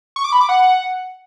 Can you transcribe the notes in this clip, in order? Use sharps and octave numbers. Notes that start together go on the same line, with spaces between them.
C#6
D6
B5
D6
F#5